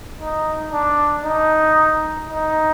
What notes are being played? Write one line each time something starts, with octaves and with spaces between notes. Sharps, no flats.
D#4
D4
D#4
D#4